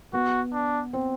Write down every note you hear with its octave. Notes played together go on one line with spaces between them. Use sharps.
B3 F#4
D4
C4